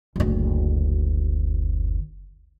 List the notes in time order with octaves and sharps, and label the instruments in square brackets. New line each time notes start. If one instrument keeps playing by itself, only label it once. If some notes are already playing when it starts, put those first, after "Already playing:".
[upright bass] F#1 D2